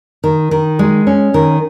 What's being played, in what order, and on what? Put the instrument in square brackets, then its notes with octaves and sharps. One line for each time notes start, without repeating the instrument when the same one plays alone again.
[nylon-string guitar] D#3
D#3
G#3
C#4
D#3